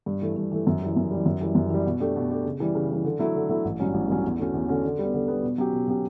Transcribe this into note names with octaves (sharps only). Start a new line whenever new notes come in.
G2
E3 A3
G2
E3 A3
F#2
E3 G3
F#2
E3 G3
F#2
E3 G3
F#2
E3 G3
B2
A3 D4 G4
B2
A3 D4 G4
C#3
E3 G3
C#3
E3 G3
D3
F#3 A3 E4
D3
F#3 A3 E4
A1
G2 F#3 C#4
A1
G2 F#3 C#4
E2
D3 A3 C#4 F#4
E2
D3 A3 C#4 F#4
D3
G3 B3
D3
G3 B3
B2
F#3 C#4 G4
B2
F#3 C#4 G4